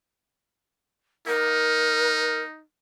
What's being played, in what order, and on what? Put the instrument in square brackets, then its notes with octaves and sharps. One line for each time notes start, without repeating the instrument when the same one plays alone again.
[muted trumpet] D#4 [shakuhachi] A#4